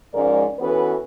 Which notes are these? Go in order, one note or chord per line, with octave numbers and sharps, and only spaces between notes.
G#2 F3 G#3 C#4 A#4 D5
E3 B3 C#4 F#4 A4 B4